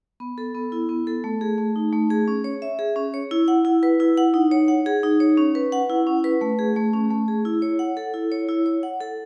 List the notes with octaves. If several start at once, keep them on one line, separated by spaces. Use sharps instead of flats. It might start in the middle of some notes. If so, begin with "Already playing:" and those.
B3
A4
B3
E4
B3
A4
A3
G#4
A3
D#4
A3
G#4
C#4
C#5
E5
G#4
C#4
C#5
E4
F#5
E4
B4
E4
F#5
D#4
C#5
F#5
G#4
D#4
C#5
C#4
B4
F#5
E4
C#4
B4
A3
G#4
A3
C#4
A3
G#4
E4
C#5
F#5
A4
E4
C#5
E4
C#5
F#5
A4